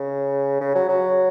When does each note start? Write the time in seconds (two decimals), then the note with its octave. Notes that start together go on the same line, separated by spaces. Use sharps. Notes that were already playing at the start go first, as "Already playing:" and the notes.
Already playing: C#3
0.60 C#3
0.75 F#3
0.89 F#3